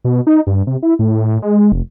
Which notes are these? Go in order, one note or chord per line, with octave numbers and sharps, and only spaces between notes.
B2
D#4
G2
C3
E4
A2
G#3
F1